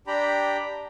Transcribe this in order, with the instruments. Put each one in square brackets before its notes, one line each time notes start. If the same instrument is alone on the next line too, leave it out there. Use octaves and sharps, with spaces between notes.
[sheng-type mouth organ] D4 G4 G5 A#5 B5